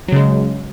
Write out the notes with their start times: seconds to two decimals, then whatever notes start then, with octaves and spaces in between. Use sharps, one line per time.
0.08 F#3
0.12 C#3
0.16 G#3